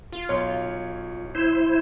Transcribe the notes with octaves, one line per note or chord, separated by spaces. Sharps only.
F4
B1 C#5
E4 C5